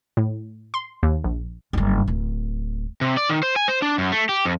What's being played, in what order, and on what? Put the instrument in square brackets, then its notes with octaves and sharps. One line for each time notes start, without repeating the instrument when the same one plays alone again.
[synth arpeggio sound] A2
C6
D#2
A#1
[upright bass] F#1 G2
D1
[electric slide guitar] C3
D5
D#3
C5
G#5
C5
D4
F#2
A3
G4
F2